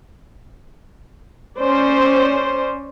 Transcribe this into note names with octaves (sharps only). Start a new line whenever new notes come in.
C#4 C5 D5